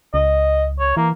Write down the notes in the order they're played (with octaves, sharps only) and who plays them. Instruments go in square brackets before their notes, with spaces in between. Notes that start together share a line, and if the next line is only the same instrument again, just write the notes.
[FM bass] C#2 [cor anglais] D#5
[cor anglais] C#5
[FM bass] E3 [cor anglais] A#3